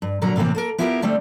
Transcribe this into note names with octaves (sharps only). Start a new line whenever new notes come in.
G2
A#2 D3 F#3 G3 A#4 A#5
A2 C3 E3 A#3 C4
A#3 A4 A#4
B3 E4 F4 G4 G#4 A#4
D3 G3 A3 C4